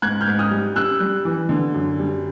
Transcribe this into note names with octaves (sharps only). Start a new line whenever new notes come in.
G#2 F#6 G#6
F6 G6
G#2
D#6 F6
G3
G3 E6 F#6
G3
E3
D3
F#2
G3